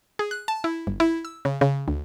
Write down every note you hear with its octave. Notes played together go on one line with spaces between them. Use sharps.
G#4
F#6
A5
E4
G1
E4
E6
C#3
C#3
D2